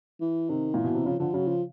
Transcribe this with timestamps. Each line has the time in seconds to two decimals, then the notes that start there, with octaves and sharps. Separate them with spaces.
0.21 E3
0.49 C3 D#3
0.74 A#2 E3
0.84 B2
0.95 C3
1.06 C#3 F3
1.19 D3 F3
1.34 C#3 F#3
1.48 F3